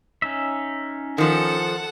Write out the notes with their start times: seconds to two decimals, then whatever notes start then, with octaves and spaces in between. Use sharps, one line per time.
0.22 C#4 D#4 E5
1.18 D#3 F3 A4 F#5